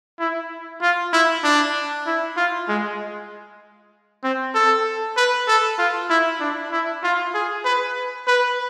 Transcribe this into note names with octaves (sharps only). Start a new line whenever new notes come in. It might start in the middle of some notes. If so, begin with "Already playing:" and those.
E4
F4
E4
D4
E4
F4
G#3
C4
A4
B4
A4
F4
E4
D4
E4
F4
G#4
B4
B4